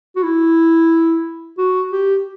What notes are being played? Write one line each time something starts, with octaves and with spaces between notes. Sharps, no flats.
F#4
E4
F#4
G4